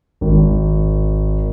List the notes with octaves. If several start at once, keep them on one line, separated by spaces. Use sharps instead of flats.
G#1